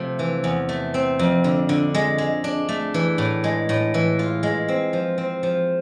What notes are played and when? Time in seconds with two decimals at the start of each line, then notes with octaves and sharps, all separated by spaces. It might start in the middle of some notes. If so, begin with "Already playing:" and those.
Already playing: C3 F3 A3
0.19 E3
0.44 E2
0.69 A3
0.94 C4
1.19 F2
1.44 D3
1.69 D3
1.94 G#3
2.18 G#3
2.44 D4
2.69 A3
2.94 E3
3.18 A2
3.44 G#3
3.69 A2
3.94 E3
4.19 F4
4.43 G#3
4.68 C4
4.93 F3
5.18 C4
5.43 F3